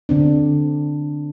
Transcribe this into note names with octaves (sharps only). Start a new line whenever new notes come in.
D3 C4 D4